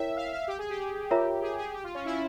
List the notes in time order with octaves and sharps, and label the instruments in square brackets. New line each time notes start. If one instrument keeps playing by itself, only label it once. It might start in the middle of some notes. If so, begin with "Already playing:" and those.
Already playing: [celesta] E4 A#4 C#5 G5 [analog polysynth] E5
[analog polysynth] F5
F5
G4
G#4
G4
[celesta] F4 A#4 C#5 E5 A#5
[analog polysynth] G#4
G#4
G4
F4
C#4
E4